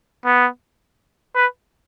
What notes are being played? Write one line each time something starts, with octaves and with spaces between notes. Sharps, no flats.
B3
B4